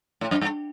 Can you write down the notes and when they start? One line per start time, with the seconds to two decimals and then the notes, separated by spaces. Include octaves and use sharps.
0.21 A2
0.31 F#2
0.41 G2